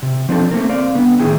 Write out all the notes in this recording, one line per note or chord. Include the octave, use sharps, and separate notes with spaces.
C3
F3 C4 D4 D#4 G#4 A4
A3 A#3 C4 A#4
C4 D5 F5
D3 B3
A2 D#3 E3 E4 G#4 G5